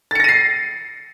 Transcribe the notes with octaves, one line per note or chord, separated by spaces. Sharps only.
A6 A#6 C7 C#7 D#7